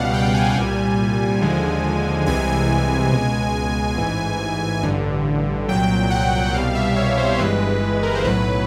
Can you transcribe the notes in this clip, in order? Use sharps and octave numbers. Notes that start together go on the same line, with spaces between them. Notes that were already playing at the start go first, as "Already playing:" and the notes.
Already playing: C#2 B2 G3 F5 F#5
G5
G#5
C2 A#2 G3
D#2 D3 F3 G#3
C2 C3 E3 G#3 G#5
C#2 B2 G#3
A1 G#2 E3
A1 G2 D3
C2 A#2 F#3 G5
F#5
C2 B2 G3 F5
E5
C#5
C5
G1 G2 E3 G#3 B4
A#4
C5
B1 A2 F#3 B4